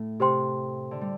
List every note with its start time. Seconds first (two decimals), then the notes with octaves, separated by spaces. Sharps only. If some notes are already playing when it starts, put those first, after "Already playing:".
Already playing: A2 A3
0.20 C3 G4 C5 G5 C6
0.91 D3
1.01 G3